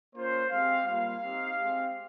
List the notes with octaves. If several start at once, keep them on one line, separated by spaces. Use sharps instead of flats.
A#3 C#4 F4 C5
G#3 C4 G4 F5
G3 A#3 F4 F5
C4 D#4 G4
G#3 C4 G4